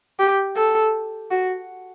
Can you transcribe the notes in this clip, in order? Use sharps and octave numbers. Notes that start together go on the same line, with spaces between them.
G4
A4
F#4